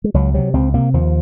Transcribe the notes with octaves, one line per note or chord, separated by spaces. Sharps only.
G#3
C#2 F#3
C3 F#3
C#2 C4
C3 A#3
D#2 F3